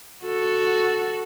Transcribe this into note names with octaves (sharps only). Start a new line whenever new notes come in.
F#4 A4